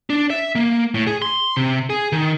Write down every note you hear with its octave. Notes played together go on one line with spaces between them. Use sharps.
D4
E5
A#3
A2
G#4
C6
C3
G#4
D#3